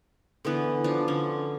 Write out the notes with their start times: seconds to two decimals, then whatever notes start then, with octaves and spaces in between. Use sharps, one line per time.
0.45 D3 E3 B3 B4
0.84 F3 D4
1.08 D3 C#4